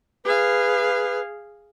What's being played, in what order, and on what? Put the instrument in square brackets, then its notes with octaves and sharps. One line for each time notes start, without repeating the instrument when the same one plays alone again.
[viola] G#4 F5 [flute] B4